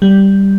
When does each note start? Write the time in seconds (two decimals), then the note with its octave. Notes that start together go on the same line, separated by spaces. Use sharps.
0.02 G3